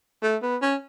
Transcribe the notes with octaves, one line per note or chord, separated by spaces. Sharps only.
A3
B3
C#4